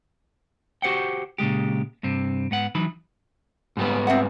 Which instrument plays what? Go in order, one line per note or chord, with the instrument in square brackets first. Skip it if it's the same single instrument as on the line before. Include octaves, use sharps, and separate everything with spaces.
[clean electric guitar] F#4 G4 C5 F#5 G5
A#2 C#3 G#3 G4
G2 C3 C4
G#2 B3 F#5
E3 F#3 D#4 B5
[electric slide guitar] G#2 G3 B3
[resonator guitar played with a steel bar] C4 E5 F#5